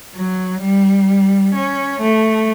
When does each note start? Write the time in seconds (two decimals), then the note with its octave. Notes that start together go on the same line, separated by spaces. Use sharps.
0.15 F#3
0.61 G3
1.54 C#4
2.01 A3